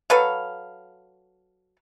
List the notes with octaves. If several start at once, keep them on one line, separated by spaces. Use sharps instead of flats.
F#3 A4 B4 F5